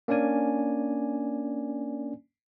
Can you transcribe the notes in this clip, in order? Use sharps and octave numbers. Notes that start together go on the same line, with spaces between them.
A#3 C#4 D4 D5 G#5